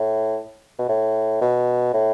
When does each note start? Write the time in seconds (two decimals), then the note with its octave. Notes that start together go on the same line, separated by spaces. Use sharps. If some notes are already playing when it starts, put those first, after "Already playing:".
Already playing: A2
0.79 B2
0.89 A2
1.41 B2
1.94 A2